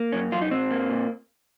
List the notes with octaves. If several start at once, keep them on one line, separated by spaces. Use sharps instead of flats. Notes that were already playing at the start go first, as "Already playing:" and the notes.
Already playing: A#3
F#2 C#4
F#2 F4
D#4
G#2 C4
A#3
A#2